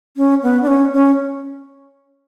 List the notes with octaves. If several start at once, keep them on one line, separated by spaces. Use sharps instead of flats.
C#4
B3
D4
C#4
C#4